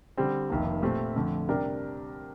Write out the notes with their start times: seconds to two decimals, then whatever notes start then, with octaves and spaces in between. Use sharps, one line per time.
0.17 D3 G3 C4
0.50 F1 F2 D#3 A#3
0.82 A#2 A3 C4 G4
1.16 F2 D3 A3
1.48 C3 G3 D4 G4 A#4